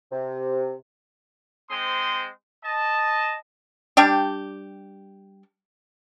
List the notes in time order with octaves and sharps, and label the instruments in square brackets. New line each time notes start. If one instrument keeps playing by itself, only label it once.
[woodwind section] C3
[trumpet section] G#3 C4 C5 C6 D#6
D#5 A5
[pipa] G3 D4 G4